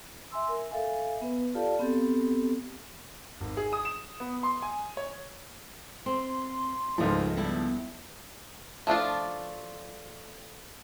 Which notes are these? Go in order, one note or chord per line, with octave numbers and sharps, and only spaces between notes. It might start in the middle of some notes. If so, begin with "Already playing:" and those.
E5 G#5 C6 E6
A#4
A4 E5 F5 G#5
B3 B4
F4 G4 A4 D5 F5 A5
B3 C4 G4 A4
G#1
G#4
D#6
E7
B3
C6
G#5
C#5
C4 C6
C#2 G#2 D#3 F3 A3
G3 B3 D4 E4
F3 A3 D4 F4